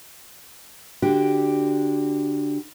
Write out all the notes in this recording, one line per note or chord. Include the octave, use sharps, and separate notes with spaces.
D3 D4 F#4 G4